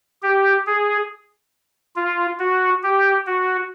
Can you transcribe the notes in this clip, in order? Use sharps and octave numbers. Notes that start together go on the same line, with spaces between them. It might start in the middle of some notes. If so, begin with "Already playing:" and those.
G4
G#4
F4
F#4
G4
F#4